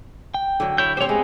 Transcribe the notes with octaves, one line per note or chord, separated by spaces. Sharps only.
G5
D3 F#3
E4 C#5 G6
C4 G4 C5 C#5
G#3 B3